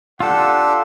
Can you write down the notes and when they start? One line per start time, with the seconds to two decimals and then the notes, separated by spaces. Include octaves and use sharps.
0.20 D4 F4 G4 A4 F#5 E6